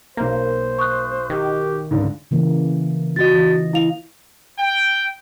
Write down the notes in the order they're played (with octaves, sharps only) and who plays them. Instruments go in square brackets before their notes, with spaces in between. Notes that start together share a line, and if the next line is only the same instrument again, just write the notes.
[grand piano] B1 A#5 [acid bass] A#3 [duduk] C5
[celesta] C#6 D#6 F#6
[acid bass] D#3 [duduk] G4
[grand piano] C#2 G#2 D3
[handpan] C#3 E3 A#3
[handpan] F4 D#5 [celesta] F#4 A6
[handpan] E3
[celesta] E4 F5 F7
[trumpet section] G5